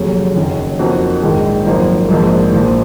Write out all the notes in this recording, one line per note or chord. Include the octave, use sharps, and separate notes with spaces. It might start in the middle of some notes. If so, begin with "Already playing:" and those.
Already playing: F1 D#2 C#3 F#3 C#4
F#1 F#2 D#3 F#3 C#4
F2 F3 A#3 D#4 F#4
A#1 G#2 D#3 G#3
G#1 F#2 F3 A#3 D#4
A#1 G#2 F3 A#3
A#1 A#2 F3